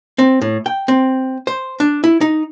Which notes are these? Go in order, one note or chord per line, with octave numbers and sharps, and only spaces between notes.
C4
A2
G5
C4
C5
D4
E4
D#4